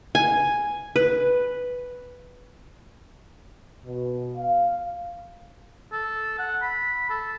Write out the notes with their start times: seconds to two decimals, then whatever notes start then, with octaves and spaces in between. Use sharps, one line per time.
0.15 G#5
0.96 B4
3.85 B2
4.37 F5
5.92 A4
6.39 F#5
6.62 B5
7.10 A4